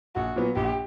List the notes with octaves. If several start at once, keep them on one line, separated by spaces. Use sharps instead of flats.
A#1 F#4
A#2 F#3 B3
A#1 G4